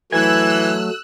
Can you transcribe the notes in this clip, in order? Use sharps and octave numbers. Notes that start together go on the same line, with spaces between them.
E3 F#3 A3 G#5 E6 F#6